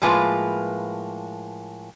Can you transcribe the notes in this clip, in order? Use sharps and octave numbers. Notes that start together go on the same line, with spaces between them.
A2 F3 G#3 A#3 F4 B4